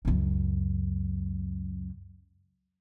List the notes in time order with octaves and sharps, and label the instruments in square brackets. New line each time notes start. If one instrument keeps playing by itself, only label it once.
[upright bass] C#2 F#2